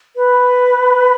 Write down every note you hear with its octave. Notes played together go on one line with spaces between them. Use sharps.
B4